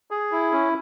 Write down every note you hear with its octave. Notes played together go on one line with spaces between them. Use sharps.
G#4
E4
C#4